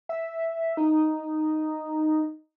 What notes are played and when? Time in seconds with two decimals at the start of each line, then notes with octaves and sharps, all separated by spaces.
0.09 E5
0.77 D#4